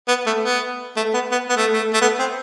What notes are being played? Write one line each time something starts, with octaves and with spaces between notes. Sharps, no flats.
B3
A3
B3
A3
B3
B3
B3
A3
A3
A3
B3
C4